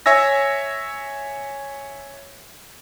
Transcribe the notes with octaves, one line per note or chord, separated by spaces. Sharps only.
C#5 E5 G#5 E6 A#6